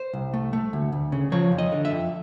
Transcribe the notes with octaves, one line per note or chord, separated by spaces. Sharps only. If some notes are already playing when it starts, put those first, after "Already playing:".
Already playing: C5
C2
A3
A3
D2
D2
C#3
F3 C#5
F2
D#5
D3
E5
F2